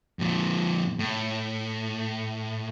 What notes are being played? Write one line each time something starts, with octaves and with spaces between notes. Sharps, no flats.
F2 A#2
A2